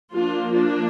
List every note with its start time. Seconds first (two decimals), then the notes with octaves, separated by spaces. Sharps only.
0.12 F3 A#3 D4 F4
0.55 D4